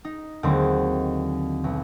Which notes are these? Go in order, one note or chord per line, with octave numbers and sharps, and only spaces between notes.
D#4
D#2 D3 F#3 G#3 C4
B1